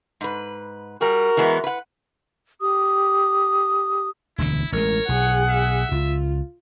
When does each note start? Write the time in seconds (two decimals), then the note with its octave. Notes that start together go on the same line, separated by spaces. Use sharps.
0.21 G#2 B4
1.01 G3 F#4 G#4 A#4
1.37 E3 G#3 B3
1.64 B4 F#5
2.61 G4 D#6
4.38 E1 D2 D3 E4
4.72 A1 G#3 A#4 C#5
5.09 B1 G#4 F#5
5.50 E5
5.91 C#2 F4